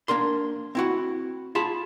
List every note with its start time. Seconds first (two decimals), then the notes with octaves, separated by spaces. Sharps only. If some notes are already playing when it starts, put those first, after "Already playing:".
0.08 A#3 D4 A#4 C6
0.75 C4 E4 F#4
1.55 F4 G#4 A5 B5